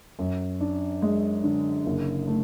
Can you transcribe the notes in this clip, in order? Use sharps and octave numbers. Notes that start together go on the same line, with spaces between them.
F#2
D4
G#3
D3
F#1
A3